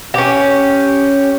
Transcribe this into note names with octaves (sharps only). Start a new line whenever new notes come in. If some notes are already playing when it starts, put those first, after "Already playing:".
C#4 G4